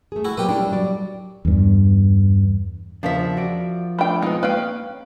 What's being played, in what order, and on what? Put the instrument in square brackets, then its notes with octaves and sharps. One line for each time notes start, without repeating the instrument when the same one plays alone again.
[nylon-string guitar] A3 G#4
[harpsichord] E4 F#4
[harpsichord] B1 G4 B4 [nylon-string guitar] A#2 F#3 A#3
[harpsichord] G3 [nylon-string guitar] D4 E4 F#5
[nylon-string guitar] A#2
F#3 D5
[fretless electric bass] E2 G2
[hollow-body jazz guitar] E2 C#3 D4 [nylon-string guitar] F3 A#4 E5
[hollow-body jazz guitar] F#4 D5
[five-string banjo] A3 G5 [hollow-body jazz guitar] D4 F5 B5
[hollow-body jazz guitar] G#3 C4 F4 [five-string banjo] B3 D#4
[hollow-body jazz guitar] A#3 [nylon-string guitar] C#4 [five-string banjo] B4 F5 G5